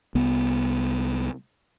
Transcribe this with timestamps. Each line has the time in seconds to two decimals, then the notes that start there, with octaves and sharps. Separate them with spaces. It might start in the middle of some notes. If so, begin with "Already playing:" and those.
0.15 C2 B3